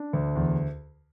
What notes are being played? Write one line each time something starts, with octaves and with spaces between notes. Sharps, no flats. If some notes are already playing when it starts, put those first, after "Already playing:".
Already playing: D4
D2
E2